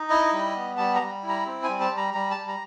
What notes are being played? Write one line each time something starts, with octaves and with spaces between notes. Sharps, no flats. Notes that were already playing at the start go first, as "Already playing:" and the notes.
Already playing: D#4
E4 D#5
G3
B3
G3 A5
A#5
G3
E4
A#5
C4
G#5
G3
A5
G3
A#5
G3 A#5
A5
G3
A#5